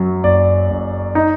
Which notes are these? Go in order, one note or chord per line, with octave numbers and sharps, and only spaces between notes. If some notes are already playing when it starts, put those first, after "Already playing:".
Already playing: F#2 F#3
F#1 D5
F#1
D#4